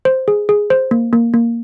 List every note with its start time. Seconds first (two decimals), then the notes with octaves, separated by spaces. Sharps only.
0.05 C5
0.28 G#4
0.49 G#4
0.70 C5
0.91 A#3
1.13 A#3
1.34 A#3